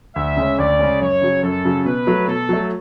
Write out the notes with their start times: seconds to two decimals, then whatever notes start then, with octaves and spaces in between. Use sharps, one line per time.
0.16 D2 E5
0.37 C#3 G#3 C#4
0.58 D2 D5
0.79 C#3 G#3 C#4
1.01 F#2 C#5
1.22 C#3 F#3
1.43 F#2 A4
1.65 C#3 F#3
1.85 B2 B4
2.07 F#3 A3
2.28 B2 A4
2.49 F#3 A3